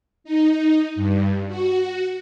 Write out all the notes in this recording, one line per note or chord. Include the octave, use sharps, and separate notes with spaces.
D#4
G2
F#4